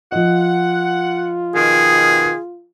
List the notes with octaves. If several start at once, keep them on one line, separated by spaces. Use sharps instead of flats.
F3 F4 D#5 F#5
B2 D#3 G#4